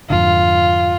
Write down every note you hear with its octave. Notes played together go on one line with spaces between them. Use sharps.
F2 G#2 D3 F4